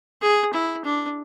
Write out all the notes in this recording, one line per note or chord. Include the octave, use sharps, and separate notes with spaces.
G#4
E4
D4